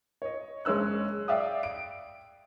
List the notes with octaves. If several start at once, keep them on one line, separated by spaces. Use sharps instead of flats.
C#5 D#5
F#1 G#3 C#4 E6 F#6
D5 E5 F5 G5 D#6
D7